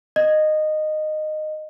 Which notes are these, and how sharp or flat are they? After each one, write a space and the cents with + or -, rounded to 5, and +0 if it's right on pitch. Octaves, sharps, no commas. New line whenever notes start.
D#5 -15